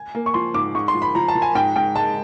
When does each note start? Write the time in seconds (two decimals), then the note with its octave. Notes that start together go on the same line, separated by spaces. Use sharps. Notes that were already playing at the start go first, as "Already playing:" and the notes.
Already playing: G#5
0.15 A#3
0.26 C#6
0.34 F3 C6
0.54 G#2 D6
0.75 G#2 C#6
0.88 C6
0.95 F3
1.02 B5
1.15 F3 A#5
1.28 A5
1.35 F3
1.42 G#5
1.55 G#2 G5
1.76 G#2 G5
1.96 G#3 A5